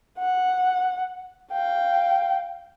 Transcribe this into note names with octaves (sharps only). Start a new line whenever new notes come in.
F#5
F5 G5